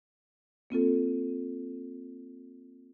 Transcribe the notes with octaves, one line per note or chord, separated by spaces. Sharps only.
A#3 C4 F4 A4